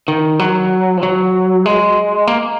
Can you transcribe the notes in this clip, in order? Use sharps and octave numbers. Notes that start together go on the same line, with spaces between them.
D#3
F#3
F3
F#3
G#3
A#3